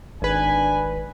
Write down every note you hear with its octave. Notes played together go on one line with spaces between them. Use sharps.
G#1 D4 B4 G#5